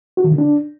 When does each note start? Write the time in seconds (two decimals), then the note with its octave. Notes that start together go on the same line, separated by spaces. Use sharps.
0.17 F#4
0.24 D#3
0.31 D3
0.38 D4